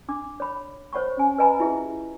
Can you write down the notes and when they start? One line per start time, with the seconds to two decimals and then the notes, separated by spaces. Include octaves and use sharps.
0.09 D4 D6
0.40 C#5 B5
0.93 C5 C#5 F#5 B5 C#6
1.17 C#4 G#5
1.38 B4 D#5 G#5 A#5 B5
1.60 E4 F4 G4 G#4 E5